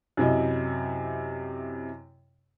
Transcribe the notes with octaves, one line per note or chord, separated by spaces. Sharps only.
F#2 C3 E4 D#5